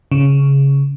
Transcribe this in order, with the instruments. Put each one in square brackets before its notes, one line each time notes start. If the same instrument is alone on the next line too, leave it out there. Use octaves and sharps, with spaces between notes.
[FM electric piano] C#3